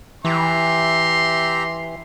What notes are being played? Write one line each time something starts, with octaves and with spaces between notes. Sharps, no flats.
E3 G4 E5 A#5 C6